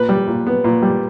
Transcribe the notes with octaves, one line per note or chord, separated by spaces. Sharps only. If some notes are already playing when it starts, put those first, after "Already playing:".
Already playing: A#2 B4
G3
A#2
B3
A#2
G3